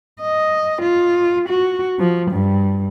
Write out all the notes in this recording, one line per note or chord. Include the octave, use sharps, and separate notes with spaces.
D#5
F4
F#4
F3
G2